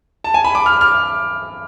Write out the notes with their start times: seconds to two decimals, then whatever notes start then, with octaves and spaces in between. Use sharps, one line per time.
0.24 A5
0.34 G#5
0.44 B5
0.55 D6
0.66 F6
0.81 F6